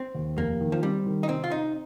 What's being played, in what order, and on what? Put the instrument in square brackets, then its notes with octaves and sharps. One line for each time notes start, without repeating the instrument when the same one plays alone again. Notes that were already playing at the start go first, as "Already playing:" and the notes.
Already playing: [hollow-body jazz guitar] C4
[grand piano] D#2
[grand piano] F1 [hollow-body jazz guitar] A#3
[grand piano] D#3
[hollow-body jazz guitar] F3
[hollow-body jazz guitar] G3 [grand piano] C4
[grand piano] D#3
[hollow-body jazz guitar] D#4
[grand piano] C3 [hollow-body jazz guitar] C4
[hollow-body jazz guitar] F4
[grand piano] C4 [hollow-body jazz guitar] D#4